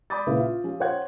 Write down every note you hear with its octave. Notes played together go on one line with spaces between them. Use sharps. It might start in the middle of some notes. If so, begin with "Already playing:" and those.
D5 B5 D6 D#6 G6 A6
A#1 C#3 E4 B4 E5
F4
F3 C#4 F4 G4
C5 C#5 F#5 G5 F#6 G#6